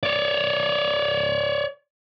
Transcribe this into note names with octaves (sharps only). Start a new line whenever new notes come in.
C#5 D5